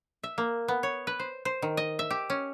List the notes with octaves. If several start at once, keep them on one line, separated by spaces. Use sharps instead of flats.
E5
A#3
B3
C#5
B4
C5
C5
D#3
D#5
E5
G4
C#4